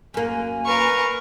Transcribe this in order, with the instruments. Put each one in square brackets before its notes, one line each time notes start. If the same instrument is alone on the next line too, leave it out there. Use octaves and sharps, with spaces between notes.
[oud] F#2 A#3 [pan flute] G#5
[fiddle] A#4 B4 [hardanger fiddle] F5 C#6